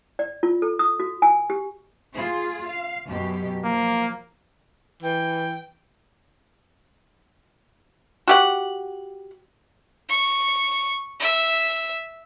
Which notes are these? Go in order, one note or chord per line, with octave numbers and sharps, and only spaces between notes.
D5
F4
A4
D#6
F#4
G#5
G4
F4 G#4
F5
F#2 B2 G4
F3 A#3
E3 G5
F#4 G4 F#5
C#6
E5